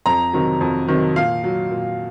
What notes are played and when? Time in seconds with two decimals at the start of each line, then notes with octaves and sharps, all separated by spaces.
0.06 F2 A#5
0.33 C3 D#3 F#3
0.61 F2
0.88 C3 D#3 F#3
1.16 A#2 F5
1.44 F#3
1.71 A#2